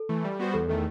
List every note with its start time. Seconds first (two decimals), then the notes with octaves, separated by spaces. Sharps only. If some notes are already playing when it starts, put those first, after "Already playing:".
Already playing: A4
0.09 E3 A3
0.24 G3
0.39 B3 F#4 C5
0.54 E2 A4
0.68 D#3 A3 A4